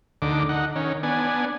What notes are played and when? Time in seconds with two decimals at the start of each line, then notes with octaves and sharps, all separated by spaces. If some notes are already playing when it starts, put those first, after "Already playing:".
0.22 D2 D3 D#4 D6
0.49 D#4 F#5
0.76 D#3 C#4
1.03 B3 D4 G#5